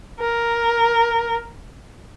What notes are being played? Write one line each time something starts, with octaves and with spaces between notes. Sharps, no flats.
A#4